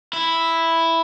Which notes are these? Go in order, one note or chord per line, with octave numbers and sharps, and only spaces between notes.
E4